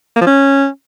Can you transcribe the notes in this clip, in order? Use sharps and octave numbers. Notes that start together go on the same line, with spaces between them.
A#3
F3
C#4